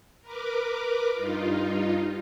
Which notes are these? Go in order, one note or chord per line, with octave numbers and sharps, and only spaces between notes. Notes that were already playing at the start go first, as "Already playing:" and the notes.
A#4 B4 D6
G2 D#4 F4